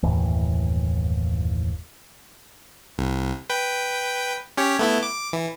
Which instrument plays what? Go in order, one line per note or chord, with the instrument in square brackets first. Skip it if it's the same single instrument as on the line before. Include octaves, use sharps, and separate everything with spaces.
[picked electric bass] F#1 D#2 A2 E3
[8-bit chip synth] C2
B4 G5
C#4 G4 C#5
A3 B3 E4
D6
E3